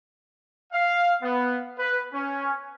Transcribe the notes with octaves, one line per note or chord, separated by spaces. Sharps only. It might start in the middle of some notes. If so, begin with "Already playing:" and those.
F5
B3
B4
C#4